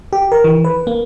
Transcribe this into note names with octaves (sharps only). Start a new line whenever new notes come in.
G4
A#4
E3
B4
A#3